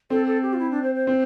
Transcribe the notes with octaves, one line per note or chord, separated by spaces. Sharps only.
C4 A4
A4
G4
F4
E4
D4
C5
C5
C4